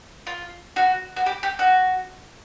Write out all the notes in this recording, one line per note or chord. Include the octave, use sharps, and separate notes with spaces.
F4
F#4
F#4
G4
G4
F#4